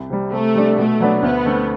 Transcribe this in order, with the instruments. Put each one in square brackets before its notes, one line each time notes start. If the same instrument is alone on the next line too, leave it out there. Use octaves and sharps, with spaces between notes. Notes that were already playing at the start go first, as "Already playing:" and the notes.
Already playing: [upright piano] C2
C3 G3
[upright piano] C3 [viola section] A3
[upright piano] G3 D4
[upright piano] B2 [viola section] A3
[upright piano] F#3 B3 D4
[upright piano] D2 [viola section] B3
[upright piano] D3 A3 C4